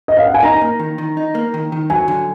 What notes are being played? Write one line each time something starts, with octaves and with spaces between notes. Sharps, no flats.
D#5
F5
F#5
G#5
D#4 A#5
A#3
D#3
D#3
D#4
A#3
D#3
D#3
F#3 G#5
D3